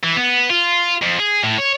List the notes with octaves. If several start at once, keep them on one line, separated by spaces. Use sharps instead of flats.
E3
B3
F4
F2
G#4
A2
C#5